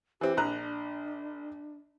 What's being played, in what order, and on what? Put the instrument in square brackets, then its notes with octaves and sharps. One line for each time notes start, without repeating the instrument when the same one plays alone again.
[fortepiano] E3 C4 [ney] G4
[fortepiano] A#1 A#5 F#6 [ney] D4